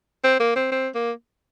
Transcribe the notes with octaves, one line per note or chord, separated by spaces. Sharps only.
C4
A#3
C4
C4
A#3